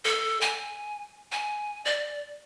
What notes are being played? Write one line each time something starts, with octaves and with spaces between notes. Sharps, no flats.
A4
G#5
G#5
D5